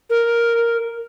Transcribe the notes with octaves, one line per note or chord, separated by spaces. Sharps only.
A#4